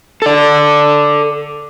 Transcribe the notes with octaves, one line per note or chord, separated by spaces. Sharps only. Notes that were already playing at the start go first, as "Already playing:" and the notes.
A4 D5